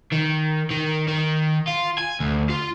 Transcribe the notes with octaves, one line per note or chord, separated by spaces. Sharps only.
D#3
D#3
D#3
F4
G#5
D2
F4